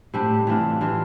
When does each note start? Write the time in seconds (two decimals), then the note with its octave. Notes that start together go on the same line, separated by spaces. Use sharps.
0.14 A2 C3 G3 D4 G4
0.47 E3 G3 D4 F4
0.81 E3 G3 D4 F4